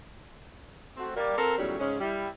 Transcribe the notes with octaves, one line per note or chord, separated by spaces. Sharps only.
A3 C4 F#4
G3 A#3 D5
C4 F4 A4 A#4
E2 D#3 F#3 G3 A3 C#4
G#2 C#3 G#3 C#4
G3 E4